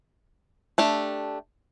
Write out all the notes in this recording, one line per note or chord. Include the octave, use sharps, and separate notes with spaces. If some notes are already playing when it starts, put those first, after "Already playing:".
A3 D4 G4